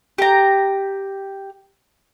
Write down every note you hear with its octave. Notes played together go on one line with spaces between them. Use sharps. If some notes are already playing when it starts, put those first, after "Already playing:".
G4 A#5